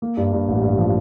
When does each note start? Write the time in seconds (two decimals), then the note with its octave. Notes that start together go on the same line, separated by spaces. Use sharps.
0.02 A#3
0.17 G2
0.33 G2
0.48 A1
0.63 G2
0.78 F3